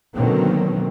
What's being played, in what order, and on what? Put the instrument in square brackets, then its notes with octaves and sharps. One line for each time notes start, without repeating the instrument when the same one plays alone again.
[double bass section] B2 D3 D#3 F#3 A#3 C4